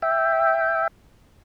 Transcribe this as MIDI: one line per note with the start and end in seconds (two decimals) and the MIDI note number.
0.02 0.88 76
0.02 0.88 79